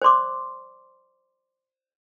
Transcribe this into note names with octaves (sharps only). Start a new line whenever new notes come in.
C5 D5 C6 D6